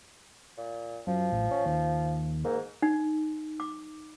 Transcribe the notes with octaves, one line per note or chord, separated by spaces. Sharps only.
A#2
F#2 F3
A1
C#4
D#2
G#2 A#3
D#4
D6